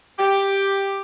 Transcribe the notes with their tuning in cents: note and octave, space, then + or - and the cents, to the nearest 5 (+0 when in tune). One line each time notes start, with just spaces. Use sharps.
G4 +5